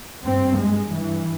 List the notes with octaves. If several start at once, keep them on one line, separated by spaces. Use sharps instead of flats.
G2 C4
G#3
G2 E3